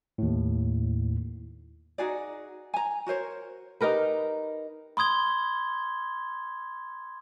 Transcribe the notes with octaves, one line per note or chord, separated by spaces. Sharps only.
D#2 A2
D#4 F#4 G#4 D5
G#5 A#5
F#4 A#4 C5 C#5
D#4 G4 A#4 B4
B5 C6 D#6 G#6 G7